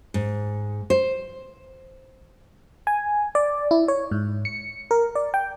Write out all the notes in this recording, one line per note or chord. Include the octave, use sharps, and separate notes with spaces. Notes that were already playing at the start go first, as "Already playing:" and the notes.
G#2
C5
G#5
D5
E4
C#5
G#2
C#7
A#4
D5
G5